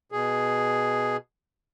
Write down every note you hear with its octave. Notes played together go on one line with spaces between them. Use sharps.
B2 G#4